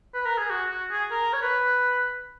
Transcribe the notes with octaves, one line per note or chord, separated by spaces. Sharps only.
B4
A#4
G#4
F#4
F#4
G#4
A#4
C#5
B4